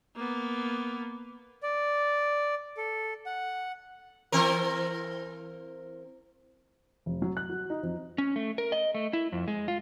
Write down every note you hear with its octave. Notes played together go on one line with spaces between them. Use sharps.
A#3 B3
D5
A4
F#5
E3 C4 A#4
F1
F#3
F#6
F#4
D#4
F2
C#4
A3
A#4
D#5
A3
E4
F2
G#3
F4